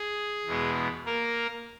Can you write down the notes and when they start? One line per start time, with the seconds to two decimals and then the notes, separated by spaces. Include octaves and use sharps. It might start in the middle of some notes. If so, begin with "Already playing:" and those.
Already playing: G#4
0.46 E2 B2 G#3 B3
1.06 A#3 A#4